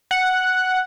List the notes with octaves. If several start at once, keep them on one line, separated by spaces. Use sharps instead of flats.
F#5